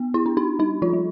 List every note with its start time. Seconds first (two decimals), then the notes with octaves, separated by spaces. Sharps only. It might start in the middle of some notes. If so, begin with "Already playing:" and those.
Already playing: B3
0.14 E4
0.26 D4
0.37 D#4
0.59 G3 D#4
0.82 F3 F4
0.93 G3